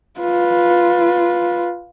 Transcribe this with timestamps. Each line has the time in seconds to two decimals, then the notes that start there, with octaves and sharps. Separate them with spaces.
0.20 F4 B4